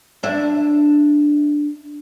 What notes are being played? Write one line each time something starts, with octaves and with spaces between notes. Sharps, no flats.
D4 E4